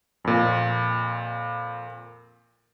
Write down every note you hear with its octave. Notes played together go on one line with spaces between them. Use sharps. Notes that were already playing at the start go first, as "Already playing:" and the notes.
F2 A#2